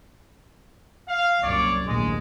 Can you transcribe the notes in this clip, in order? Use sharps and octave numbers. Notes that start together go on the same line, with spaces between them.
F5
C2 F#2 A#2 C#5 D5
A#1 D#2 A2 G#3